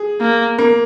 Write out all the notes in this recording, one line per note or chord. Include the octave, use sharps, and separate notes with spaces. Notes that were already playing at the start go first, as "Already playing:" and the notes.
Already playing: G#4
A#3
A#3